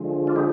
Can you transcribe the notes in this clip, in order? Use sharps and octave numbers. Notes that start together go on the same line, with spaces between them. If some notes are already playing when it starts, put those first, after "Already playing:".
Already playing: D3 F3 G#3
D4 F4
D#4 G4